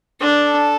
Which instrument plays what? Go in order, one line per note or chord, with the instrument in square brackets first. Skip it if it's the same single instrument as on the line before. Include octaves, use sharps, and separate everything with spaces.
[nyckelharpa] D4 [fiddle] A4